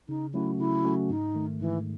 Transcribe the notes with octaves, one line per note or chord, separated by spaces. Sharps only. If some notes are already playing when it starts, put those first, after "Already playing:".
C#3 D#4
F#3 A3 C#4 E4 F#4
C#3 E4
F#3 A3 C#4 F#4
G#2 D#4
D#3 A3
G#2 E3